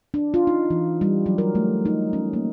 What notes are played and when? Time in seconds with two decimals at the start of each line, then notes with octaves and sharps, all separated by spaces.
0.14 D4
0.34 F4
0.47 D#4
0.70 E3
1.01 G3
1.26 F#3
1.38 A#4
1.55 A3
1.85 D#4
2.13 C#4
2.33 A#3